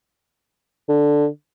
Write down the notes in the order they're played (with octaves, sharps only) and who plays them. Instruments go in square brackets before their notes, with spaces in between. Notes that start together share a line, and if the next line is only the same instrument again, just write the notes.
[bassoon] D3